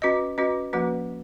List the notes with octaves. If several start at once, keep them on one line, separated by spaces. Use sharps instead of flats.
C#4 F#4 B4 D#5
C#4 F#4 B4 D#5
F3 A#3 C#4 F#4 B4